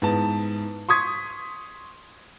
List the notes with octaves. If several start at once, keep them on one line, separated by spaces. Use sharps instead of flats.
G#2 B3 E4 A5
C6 C#6 D#6 G#6 B6